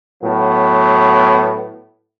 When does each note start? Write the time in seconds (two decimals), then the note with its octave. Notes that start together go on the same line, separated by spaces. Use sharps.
0.22 A2 F#3 B3